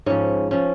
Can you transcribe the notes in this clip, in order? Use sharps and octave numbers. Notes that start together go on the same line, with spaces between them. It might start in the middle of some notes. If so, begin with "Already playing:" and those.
G#2 F3 C#4
F3 C#4